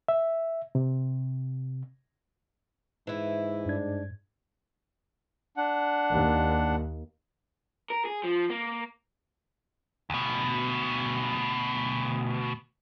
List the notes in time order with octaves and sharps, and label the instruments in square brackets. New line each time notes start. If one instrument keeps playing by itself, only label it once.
[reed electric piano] E5
C3
[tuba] G#2 [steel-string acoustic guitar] E3 E4
[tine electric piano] G2 G#6 [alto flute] D4
[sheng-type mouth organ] D4 F#5
[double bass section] D#2
[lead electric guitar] A#4
G#4
F3
A#3
D2 B2